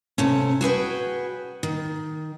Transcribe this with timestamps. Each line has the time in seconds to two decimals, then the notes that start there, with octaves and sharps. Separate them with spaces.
0.18 C3 A3 C#4
0.61 F#4 G#4 B4 G5
1.63 D#3